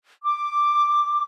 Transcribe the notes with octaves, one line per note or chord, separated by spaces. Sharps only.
D6